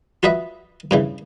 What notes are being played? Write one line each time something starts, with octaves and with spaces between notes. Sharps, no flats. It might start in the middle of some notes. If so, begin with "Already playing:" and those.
F4 F#4 B4 D#5 E5
G2 C#3 E3